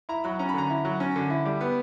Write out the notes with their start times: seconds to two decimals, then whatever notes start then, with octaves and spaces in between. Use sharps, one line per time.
0.09 E4 A#5
0.24 F#3 B5
0.39 C#4 A#5
0.49 B5
0.54 D3 A#5
0.70 E4
0.85 F#3
1.00 C#4
1.16 D3
1.30 E4
1.45 G3
1.61 B3